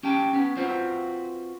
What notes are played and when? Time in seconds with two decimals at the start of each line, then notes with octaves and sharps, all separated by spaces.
0.03 C#4 G4 G5 A5
0.33 B3 C#4
0.57 C4 F4 F#4 B4 C5